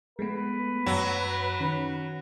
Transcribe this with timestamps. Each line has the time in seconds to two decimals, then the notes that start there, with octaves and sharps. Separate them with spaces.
0.19 G#3 A3 B3 B4
0.86 F#2 F#3
1.60 D#3 C#4